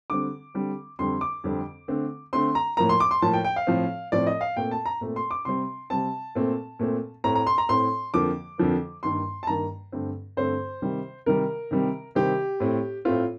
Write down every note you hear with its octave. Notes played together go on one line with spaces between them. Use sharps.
D3 G3 C4 D6
D3 G3 C4
F2 D3 G3 C4 C6
D6
F2 D3 G3 C4
D3 A3 C4
D3 A3 C4 C6
A#5
A2 F3 A#3 A#5
C6
D6
C6
A2 F3 A#3 A5
G5
G5
F5
A2 F3 C4
A2 F3 C4 D5
D#5
F5
A#2 A3 C4 G5
A5
A#5
A#2 A3 C4
C6
D6
C3 G3 C4 C6
C3 G3 C4 A5
A#2 A3 C4
A#2 A3 C4
A2 A3 C4 A#5
A#5
C6
A#5
A2 A3 C4 C6
F2 D3 F3 A#3 D6
F2 D3 F3 A#3
G2 D#3 A#3 C6
A5
G2 D#3 A#3 A#5
G2 D3 A3 C4
G2 D3 A3 C4 C5
C3 D#3 G3
C3 D#3 G3 A#4
C3 D#3 G3 C4
C3 D#3 G3 C4 G4
A2 A3 C4
A2 A3 C4 F4